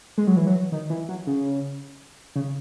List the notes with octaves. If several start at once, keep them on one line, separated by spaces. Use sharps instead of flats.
G#3
F#3
E3
F#3
D#3
E3
F#3
C#3
C#3